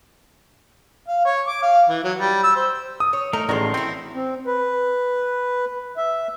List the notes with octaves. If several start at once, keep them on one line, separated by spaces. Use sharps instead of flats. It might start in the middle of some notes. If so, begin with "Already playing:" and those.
F5
C#5
D6
F5
E3
F#3
G3
E6
C5
D#6
C#5
A3 D#4 A#4
A1 D#3 G#3 D4 F#4 A#5 C6
C4 D#4 E4
C4
B4
E5